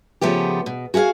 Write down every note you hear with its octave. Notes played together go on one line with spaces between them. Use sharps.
C#3 F3 A3 B3 G4
B2
F#4 G#4 E5 F5 G#5